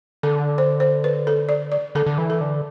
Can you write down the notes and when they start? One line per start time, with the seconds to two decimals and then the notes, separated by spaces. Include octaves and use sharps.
0.23 D3 A4
0.58 C5
0.80 C5
1.04 B4
1.27 A4
1.49 D5
1.72 D5
1.95 D3 A4
2.06 D3
2.18 E3
2.30 A4
2.41 D3